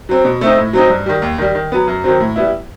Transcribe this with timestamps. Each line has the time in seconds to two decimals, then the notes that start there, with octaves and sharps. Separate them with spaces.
0.09 F#3 C4
0.25 B2
0.41 A3 C4 D#4
0.58 A2
0.73 F#3 C4 D#4
0.90 G2
1.06 D#3 G3
1.22 D#2
1.38 D#3 G3
1.55 D#3
1.72 F#3 B3
1.87 F#2
2.04 D#3 F#3 C4
2.20 A2
2.36 G3 B3 E4